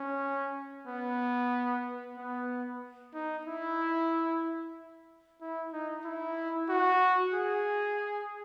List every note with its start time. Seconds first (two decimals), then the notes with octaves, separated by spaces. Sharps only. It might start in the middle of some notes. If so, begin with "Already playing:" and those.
Already playing: C#4
0.87 B3
2.17 B3
3.14 D#4
3.46 E4
5.41 E4
5.73 D#4
6.04 E4
6.69 F#4
7.34 G#4